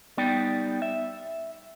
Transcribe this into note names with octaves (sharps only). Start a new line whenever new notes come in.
G3 B3 D#4 D5 G5
E5